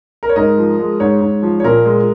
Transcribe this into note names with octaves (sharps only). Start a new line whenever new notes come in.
A#4
C#5
G#2 A#4 D#5
F3
G#3
G#2 C#5
G#2
F3
C#5
A#2 A#4
G#3